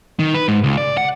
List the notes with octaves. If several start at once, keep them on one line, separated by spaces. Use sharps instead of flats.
D#3
B4
G#2
C#2
D5
F#5